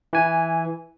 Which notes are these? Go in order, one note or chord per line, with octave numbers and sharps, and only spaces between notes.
E3 G#5